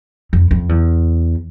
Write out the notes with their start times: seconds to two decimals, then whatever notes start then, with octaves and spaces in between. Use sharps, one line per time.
0.33 F2
0.51 F2
0.69 E2